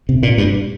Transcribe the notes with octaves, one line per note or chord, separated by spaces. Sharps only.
C3
A#2
G2